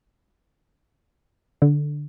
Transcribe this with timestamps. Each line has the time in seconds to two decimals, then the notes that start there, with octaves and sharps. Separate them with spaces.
1.62 D3